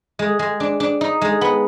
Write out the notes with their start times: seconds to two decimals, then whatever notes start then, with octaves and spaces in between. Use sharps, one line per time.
0.19 G#3
0.39 G#3
0.60 D4
0.80 D4
1.01 D#4
1.21 G#3
1.41 B3